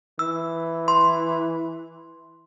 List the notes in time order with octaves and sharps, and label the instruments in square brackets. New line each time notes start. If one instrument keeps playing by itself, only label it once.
[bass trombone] E3 [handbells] E6
[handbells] C6